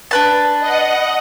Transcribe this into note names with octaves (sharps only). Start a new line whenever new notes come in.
D4 B4 A5
D#5 F#5